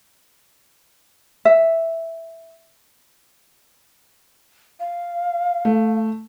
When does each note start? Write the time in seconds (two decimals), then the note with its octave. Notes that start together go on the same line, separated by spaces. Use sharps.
1.45 E5
4.80 F5
5.65 A3